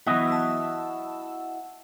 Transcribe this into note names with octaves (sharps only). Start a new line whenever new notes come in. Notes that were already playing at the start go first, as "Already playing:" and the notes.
E3 F#3 B3 E4 F#4 D#5
A5 E6